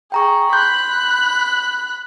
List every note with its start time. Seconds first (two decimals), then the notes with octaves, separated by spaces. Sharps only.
0.12 G#4 G5 A#5 C#6
0.53 B5 C6 F#6 G6